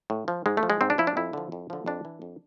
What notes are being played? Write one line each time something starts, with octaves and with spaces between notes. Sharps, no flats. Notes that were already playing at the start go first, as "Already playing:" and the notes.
A2
F3
G#2 G#3
A3
F3
G#3
G#2 C4
D4
F3 E4
D4
F2 E4
D3 F3
F2
D3 F3
F2 D4
E3
F2